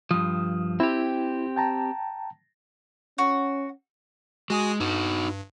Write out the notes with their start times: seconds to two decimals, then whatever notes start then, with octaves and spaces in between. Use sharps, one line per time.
0.11 G2 F3 D#6
0.80 C4 E4 G4
1.56 G5 A5 A#5
3.18 C#4 F#4
4.50 G#3 F#4 G#5 D#6
4.80 G2 D#4 F#4